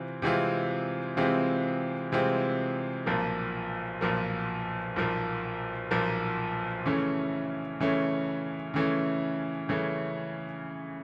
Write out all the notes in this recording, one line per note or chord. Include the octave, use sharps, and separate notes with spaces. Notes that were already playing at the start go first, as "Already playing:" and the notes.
Already playing: C3 E3 C4 F4
C3 E3 G#3 C4 F4
C3 E3 G#3 C4 F4
C3 E3 G#3 C4 F4
B1 A#2 F3 A#3
B1 A#2 F3 A#3
B1 A#2 F3 A#3
B1 A#2 F3 A#3
C#3 E3 A3 C#4
C#3 E3 A3 C#4
C#3 E3 A3 C#4
C#3 E3 A3 C#4